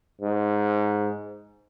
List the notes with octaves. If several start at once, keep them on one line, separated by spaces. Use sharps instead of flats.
G#2